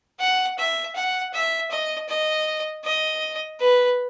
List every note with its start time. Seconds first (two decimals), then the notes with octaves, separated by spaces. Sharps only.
0.20 F#5
0.58 E5
0.95 F#5
1.33 E5
1.71 D#5
2.09 D#5
2.84 D#5
3.60 B4